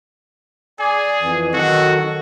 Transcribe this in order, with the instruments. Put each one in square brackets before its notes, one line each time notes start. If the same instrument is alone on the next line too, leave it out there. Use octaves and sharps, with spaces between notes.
[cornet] G#4 [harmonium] D5 G#5
[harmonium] F2 E3
[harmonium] D#3 F#3 A4 [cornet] F#4